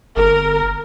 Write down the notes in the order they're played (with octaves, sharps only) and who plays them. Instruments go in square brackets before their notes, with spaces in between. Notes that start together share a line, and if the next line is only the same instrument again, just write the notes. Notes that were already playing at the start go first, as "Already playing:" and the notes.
[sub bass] G1 [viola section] A#4